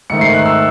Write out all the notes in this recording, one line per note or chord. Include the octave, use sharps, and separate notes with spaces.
G#2 D#3 A3 C#7
C7
F#6
E6